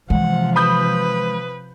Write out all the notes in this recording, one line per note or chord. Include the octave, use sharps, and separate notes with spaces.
C3 E3 F3 G#3 F#5
B4 B5 D#6 G6